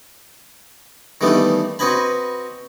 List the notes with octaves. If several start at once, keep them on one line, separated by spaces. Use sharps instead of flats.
D#3 E3 G3 A3 B3 D4
C4 F#4 B4 D#5 G#5 B5